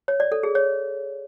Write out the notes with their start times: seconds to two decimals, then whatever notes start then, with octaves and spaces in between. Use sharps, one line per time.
0.08 C#5
0.20 D5
0.32 A4
0.43 G#4
0.55 C#5